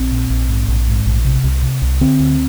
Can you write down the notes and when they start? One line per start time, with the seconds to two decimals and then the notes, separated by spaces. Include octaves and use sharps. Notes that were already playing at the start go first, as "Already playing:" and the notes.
Already playing: A#1 C4
0.11 A#2
0.30 A#1
0.49 G#2
0.68 A#1
0.87 G#2
1.06 A#1
1.25 C3
1.44 C2
1.62 C3
1.82 C2
2.01 D3 C4
2.19 D2